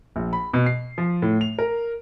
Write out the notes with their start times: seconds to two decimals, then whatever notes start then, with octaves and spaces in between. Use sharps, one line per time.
0.16 A#1
0.33 B5
0.54 B2
0.66 C7
0.98 F3
1.22 A2
1.41 F7
1.59 A#4